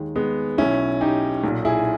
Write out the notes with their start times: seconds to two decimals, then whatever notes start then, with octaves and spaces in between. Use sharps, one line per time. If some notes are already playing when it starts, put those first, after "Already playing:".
Already playing: D#2 D#3 G#3
0.16 G#3 B3
0.58 B1 B2 C#4 E4
1.01 D#4 G4
1.44 B1 A#2
1.65 E4 G#4